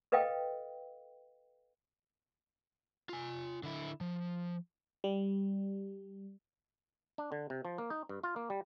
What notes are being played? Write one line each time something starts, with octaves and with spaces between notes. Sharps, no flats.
A4 B4 D#5 F5 G5
F4 G#5
D3 E4
F3
G3
D4
D3
C3
F3
A#3
D#4
G2
F4
A#3
G3